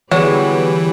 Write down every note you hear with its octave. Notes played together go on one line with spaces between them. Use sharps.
D3 E3 F#3 G3 B3 G4 G#4 C#5